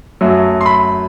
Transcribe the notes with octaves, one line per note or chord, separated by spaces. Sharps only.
F#2 F#3 A3
C6
B5